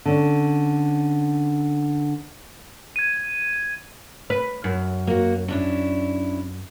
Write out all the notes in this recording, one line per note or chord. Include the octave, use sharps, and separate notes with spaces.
D3 C#4
G#6 D#7
B4
F#2
A#3 F#4
C#4 D4 E4